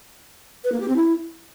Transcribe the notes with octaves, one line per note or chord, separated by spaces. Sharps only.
B4
A#3
G4
C4
E4